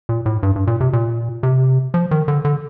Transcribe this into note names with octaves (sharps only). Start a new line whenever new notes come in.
A#2
A2
G2
G2
A#2
C3
A#2
C3
F3
D#3
D3
D3